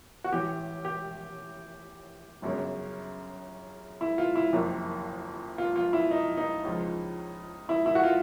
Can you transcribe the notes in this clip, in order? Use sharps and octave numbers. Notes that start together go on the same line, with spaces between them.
F#4
A1 A2 E3 G4
G4
G1 F#2 C#3
E4
F4
E4
F#1 F2 C3 D#3
F4
F4
E4
D#4
D#4
C#2 C#3 F3
E4
E4
F#4
F4